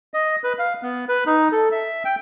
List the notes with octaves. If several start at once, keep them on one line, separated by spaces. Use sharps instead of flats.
D#5
B4
F5
B3
B4
D#4
A4
E5
G5